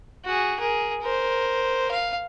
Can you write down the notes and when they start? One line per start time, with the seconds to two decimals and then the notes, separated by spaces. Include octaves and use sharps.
0.25 F#4 G#4
0.60 G#4 A#4
1.01 A#4 C5
1.91 F5